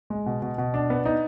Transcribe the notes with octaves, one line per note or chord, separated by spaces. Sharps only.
G#3
B2
B2
B2
D4
B3
D#4